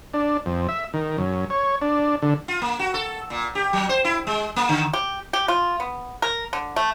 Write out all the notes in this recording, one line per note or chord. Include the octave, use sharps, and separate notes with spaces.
D4
F2
E5
D#3
F#2
C#5
D4
D3
F4
A#3
F#4
A4
A#2
G4
F#3
C5
E4
G#3
A#3
D3
G4
G4
F4
B3
A#4
D3
A3